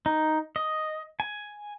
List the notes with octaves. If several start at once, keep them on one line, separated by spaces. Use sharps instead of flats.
D#4
D#5
G#5